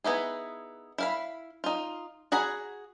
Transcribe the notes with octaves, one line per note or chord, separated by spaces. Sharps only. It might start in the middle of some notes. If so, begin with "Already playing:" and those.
B3 D#4 E4 G#4
E4 F5 B5
D#4 F4
F#4 G#4 F#5 A#5 B5